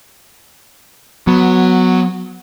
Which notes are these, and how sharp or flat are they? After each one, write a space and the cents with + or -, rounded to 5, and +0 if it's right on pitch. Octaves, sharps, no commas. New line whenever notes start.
F#3 -10 B3 +5